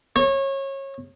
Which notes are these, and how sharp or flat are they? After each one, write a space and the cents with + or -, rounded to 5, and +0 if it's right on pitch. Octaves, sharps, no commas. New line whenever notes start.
C#5 -25